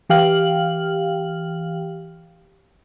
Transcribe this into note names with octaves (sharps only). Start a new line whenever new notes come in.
E3 G4 F5 G5 F6 F#7